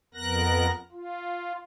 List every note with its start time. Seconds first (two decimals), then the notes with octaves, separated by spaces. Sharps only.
0.14 F2 B3 A#4 F#6 A#6
0.92 F4